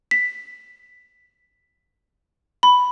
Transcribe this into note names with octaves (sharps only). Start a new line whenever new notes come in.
B6
B5